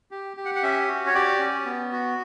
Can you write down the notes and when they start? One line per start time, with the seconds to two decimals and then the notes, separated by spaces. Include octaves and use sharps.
0.11 G4
0.37 G4
0.45 F#5
0.56 F#5
0.63 C#4 E5
0.88 F#4
1.07 C#5
1.15 G4 D5
1.40 C#4
1.65 B3
1.92 F#4